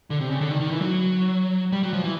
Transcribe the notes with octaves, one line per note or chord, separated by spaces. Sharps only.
D3
C3
C#3
D3
D#3
D#3
E3
F#3
G3
F#3
F3
E3